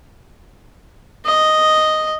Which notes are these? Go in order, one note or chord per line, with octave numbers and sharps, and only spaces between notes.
D#5